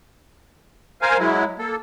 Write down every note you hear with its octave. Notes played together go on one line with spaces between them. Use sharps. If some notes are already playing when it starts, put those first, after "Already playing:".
A#4 C5 F5 G#5
F#3 G#3 E4
A#3 A4